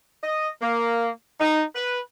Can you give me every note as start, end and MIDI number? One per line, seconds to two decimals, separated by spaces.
0.23 0.49 75
0.61 1.10 58
1.40 1.63 63
1.76 2.00 71